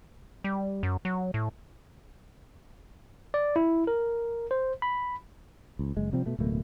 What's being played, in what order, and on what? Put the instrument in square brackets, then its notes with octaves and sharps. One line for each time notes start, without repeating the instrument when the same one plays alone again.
[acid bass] G3
F#2
F#3
A2
[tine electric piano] D5
E4
A#4
C5
B5
[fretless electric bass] C#2
F#1 G#3
C3 F3 G3 C4
B2 A3
D1 B2 A3 A#3